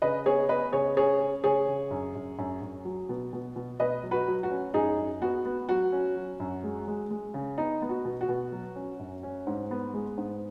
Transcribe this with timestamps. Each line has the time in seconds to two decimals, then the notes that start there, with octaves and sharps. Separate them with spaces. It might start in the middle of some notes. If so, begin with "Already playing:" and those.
0.02 C#3 B4 D#5
0.26 B3 G#4 C#5
0.49 B3 B4 D#5
0.72 C#3 G#4 C#5
0.96 C#4 G#4 C#5
1.20 C#4
1.44 C#3 G#4 C#5
1.68 C#3
1.91 F#2
2.15 F#2
2.38 F#2
2.62 F#2
2.85 F#3
3.09 B2
3.33 B2
3.56 B2
3.79 B2 B4 D#5
4.03 F#3
4.11 F#4 B4
4.28 F#3
4.43 F#4
4.51 C#4
4.74 F#2 D#4 G#4
4.98 F#2
5.22 B3 F#4
5.45 B3
5.69 F#3 F#4
5.92 C#4
6.16 F#3
6.40 F#2
6.63 G#3
6.88 G#3
7.10 G#3
7.34 C#3
7.58 B3 D#4
7.82 B3
7.89 F#4
8.05 B2
8.21 F#4
8.28 B2
8.52 F#3
8.76 C#4
9.00 F#2
9.23 C#4
9.47 G#2
9.71 B3
9.94 G#3
10.18 G#2